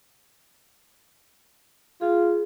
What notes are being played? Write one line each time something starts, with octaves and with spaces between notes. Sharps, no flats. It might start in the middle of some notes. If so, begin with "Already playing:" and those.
F4 G#4